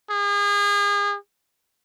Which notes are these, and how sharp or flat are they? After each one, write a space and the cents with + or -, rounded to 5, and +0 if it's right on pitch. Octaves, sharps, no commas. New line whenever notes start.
G#4 -35